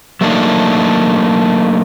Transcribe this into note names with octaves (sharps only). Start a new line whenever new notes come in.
F#3 A3 A#3 D4 D#4